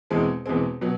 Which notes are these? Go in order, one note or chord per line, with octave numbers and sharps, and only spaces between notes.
E2 B2 G#3 C4
E2 B2 G#3 C4
B2 F#3